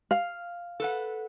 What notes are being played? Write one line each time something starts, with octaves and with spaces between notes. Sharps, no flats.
F5
A4 B4 F#5